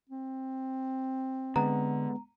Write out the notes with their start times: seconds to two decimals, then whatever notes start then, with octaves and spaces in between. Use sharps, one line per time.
0.09 C4
1.56 D3 G#3 B3 A#5